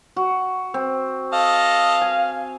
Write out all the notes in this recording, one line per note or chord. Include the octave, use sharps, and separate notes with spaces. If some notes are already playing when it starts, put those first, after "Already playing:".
F#4
C4
A4 D#5 F5
G#5